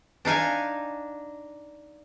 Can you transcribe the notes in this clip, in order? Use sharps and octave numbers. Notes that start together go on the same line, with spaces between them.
D4 D#4 F5 G#5